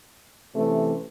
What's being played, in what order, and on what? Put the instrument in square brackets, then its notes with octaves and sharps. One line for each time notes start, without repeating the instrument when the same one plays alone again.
[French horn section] C3 E3 C#4 [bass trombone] A3